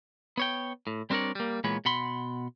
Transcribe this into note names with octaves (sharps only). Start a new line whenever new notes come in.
B3 C#5 G5
A2
G3 C4 D4 A#4 C#5 D5
G3 A#3
A#2 E3 G#3 B3 C#5 B5
B2 F#5 B5 C6